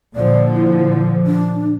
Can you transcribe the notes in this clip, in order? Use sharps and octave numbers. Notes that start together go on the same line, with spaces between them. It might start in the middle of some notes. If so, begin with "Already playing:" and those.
A#2 D3 F3 D5
E4
D4